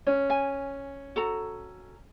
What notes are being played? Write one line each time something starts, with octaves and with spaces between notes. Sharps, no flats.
C#4
G#5
F#4 A4 A#5